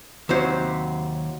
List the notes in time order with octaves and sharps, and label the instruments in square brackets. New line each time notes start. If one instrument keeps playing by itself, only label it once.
[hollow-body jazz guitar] D#2 C3 F#3 C5